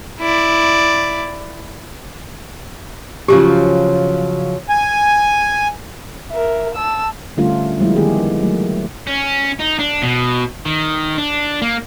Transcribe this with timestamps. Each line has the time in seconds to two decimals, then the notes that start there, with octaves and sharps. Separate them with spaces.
0.20 E4 D5
3.28 C#3 F3 F#3 G4
4.69 G#5
6.31 A#4 E5
6.75 A5 E6
7.37 D3 G3 A3 C#4 F4
7.80 F3 G3 G#3 A#3 E4
7.96 D#3 B3 F4 G4 G#4
8.39 F#3 A3
9.07 C#4
9.59 D#4
9.79 D4
10.02 B2
10.65 D#3
11.18 D4
11.62 A#3